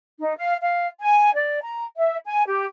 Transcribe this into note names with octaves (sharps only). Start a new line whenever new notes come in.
D#4
F5
F5
G#5
D5
A#5
E5
G#5
G4